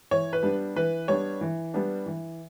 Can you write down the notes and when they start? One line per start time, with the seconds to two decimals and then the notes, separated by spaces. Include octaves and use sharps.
0.11 E3 C#5
0.33 B4
0.43 G3 B3 D4
0.76 E3 B4
1.08 G3 B3 D4 C#5
1.41 E3
1.74 G3 B3 D4
2.06 E3